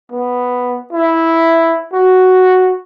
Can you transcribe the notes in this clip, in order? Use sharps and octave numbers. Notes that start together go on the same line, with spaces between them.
B3
E4
F#4